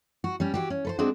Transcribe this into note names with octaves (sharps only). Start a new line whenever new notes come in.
F#4
G3 C#4
E3 F#4 G4
C#4
A4 B4 C5
G#3 C4 D4 F#4